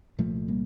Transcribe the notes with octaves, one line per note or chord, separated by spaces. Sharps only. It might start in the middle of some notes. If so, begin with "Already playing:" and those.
C2 A#2 F3 A3
G3 A#3